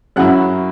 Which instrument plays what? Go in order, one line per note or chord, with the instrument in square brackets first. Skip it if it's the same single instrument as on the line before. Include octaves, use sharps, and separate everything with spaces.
[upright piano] F#2 F#3 C#4 E4 F#5